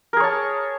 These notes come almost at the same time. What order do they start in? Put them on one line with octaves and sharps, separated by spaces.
A#4 G#4 C#5 A5